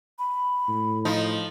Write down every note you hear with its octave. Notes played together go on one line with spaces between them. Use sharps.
B5
A2
F3 D#4